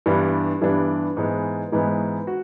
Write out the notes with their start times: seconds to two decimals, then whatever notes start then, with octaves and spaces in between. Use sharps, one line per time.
0.06 G2 E3 G3 B3 D4
0.62 G2 E3 G3 B3 D4
1.17 G#2 E3 G#3 B3
1.72 G#2 E3 G#3 B3
2.27 F#4